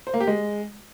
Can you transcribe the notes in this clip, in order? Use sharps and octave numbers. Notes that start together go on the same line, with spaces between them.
C5
A#3
G4
G#3